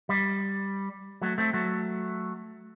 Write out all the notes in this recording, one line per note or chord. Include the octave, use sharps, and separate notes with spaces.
G3
F#3 A3
A3 C4
F#3 A3